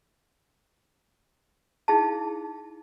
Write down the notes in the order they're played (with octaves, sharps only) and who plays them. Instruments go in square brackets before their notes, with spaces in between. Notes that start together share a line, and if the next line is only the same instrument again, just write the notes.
[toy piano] D#4 E4 G#4 F5 A5